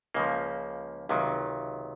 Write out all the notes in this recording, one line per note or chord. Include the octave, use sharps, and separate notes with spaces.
C#2 C#3 F3 A#3
C#2 C3 D#3 F#3